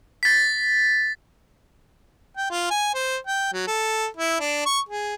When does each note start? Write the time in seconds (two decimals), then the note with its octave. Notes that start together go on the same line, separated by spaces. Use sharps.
0.23 A6 B6
2.37 G5
2.50 F4
2.70 G#5
2.95 C5
3.27 G5
3.53 F#3
3.67 A4
4.17 E4
4.40 D4
4.65 C#6
4.89 G#4